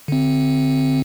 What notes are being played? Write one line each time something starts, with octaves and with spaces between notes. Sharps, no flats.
D3 C4